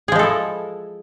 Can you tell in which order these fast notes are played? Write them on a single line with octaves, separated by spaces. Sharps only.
G#4 F3 G#3 A4 E4